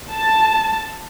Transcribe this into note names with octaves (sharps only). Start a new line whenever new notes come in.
A5